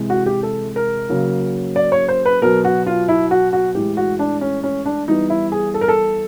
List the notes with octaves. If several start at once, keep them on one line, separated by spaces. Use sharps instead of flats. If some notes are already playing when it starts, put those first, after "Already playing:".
Already playing: C3 E3 G#3
F#4
G4
A4
A#4
C#3 F#3 A#3
D5
C#5
C5
B4
B2 F#3 B3 A#4
F#4
F4
E4
F#4
F#4
A2 E3 G#3 G4
F#4
D4
C#4
C#4
D4
E3 G3 B3 D#4
E4
G#4
A4
A#4
A4